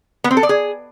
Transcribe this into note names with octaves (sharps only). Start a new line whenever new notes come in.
B3
C4
A4
D5
G#4